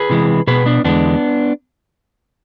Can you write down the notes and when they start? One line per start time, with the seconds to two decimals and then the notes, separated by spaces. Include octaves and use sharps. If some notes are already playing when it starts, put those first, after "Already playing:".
Already playing: G#4 B4
0.10 C3 E3 G#3
0.47 B2 B3 G#4 B4
0.66 B3 D4
0.84 E2 D3 G#3 B3 D4